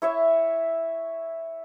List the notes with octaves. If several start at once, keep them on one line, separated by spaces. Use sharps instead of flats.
E4 C#5 E5